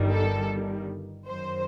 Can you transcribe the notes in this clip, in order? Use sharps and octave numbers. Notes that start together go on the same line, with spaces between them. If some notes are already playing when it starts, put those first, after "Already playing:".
Already playing: G1 G2 D#3 G3
A4
F#2 D#3 F#3 C5